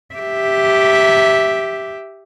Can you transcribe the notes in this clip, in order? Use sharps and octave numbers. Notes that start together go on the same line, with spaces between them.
G4 E5